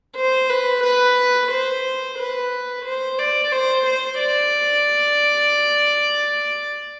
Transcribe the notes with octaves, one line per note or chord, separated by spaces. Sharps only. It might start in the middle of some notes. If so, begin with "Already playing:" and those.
C5
B4
B4
C5
B4
C5
D5
C5
C5
D5